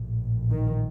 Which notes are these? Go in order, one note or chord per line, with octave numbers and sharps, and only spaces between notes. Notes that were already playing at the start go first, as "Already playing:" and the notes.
Already playing: A#1 A2
D#3